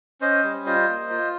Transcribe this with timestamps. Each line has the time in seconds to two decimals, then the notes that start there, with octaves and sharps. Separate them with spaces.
0.21 C#4 C5 D#5
0.43 G3
0.66 F4 C5 D#5
0.89 A#3
1.10 F4